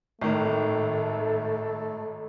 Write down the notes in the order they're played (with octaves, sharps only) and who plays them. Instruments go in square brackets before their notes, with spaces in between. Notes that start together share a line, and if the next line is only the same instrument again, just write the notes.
[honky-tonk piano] G#1 [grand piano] A2 D#3 [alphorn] A3 [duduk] A4